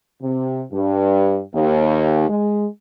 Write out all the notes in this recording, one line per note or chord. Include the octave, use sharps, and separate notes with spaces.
C3
G2
D#2
G#3